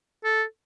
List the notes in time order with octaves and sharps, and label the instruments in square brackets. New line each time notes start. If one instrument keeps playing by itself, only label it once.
[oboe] A4